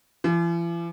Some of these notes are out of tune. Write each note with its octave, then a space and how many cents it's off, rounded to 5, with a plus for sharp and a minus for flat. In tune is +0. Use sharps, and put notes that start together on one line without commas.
E3 +45